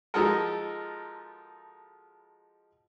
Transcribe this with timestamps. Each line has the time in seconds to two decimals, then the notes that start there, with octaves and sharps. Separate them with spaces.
0.14 F3 G#3 D#4 F#4 A4 A#4